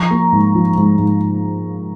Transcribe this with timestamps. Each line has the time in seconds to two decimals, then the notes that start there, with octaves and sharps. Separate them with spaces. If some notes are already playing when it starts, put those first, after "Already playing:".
Already playing: F3 A#5 C#6
0.11 A#3
0.32 G#2
0.55 F3
0.77 G#2
0.98 G#2